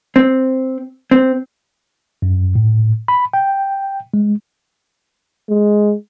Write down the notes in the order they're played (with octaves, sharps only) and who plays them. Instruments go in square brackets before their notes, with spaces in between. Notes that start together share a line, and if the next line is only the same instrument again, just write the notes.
[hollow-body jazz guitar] C4
C4
[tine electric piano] F#2
A2
B5
G5
G#3
[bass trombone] G#3